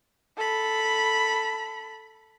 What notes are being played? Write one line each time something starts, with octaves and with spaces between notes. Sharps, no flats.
A4 B5